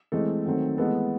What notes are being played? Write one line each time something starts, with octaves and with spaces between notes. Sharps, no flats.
E3 G#3 A3 C4 A4
D#3 F#3 A3 C4
E3 G#3 A3 B3 A4